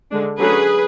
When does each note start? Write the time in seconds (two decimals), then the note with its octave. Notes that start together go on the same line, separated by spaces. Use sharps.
0.11 D3 G#3 D4
0.39 D3 F#3 A3 C#4 G#4 B4